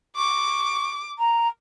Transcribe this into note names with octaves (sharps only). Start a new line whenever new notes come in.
C#6 D6
A#5